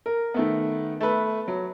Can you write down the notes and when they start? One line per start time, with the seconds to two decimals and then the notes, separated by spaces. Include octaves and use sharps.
0.06 A#4
0.34 D#3 A3 B3
1.01 A3 B4
1.48 F#3